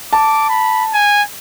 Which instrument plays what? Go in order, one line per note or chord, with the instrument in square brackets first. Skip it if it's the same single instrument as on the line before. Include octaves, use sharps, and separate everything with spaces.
[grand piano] A5 [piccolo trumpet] D6
[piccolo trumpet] B5
G#5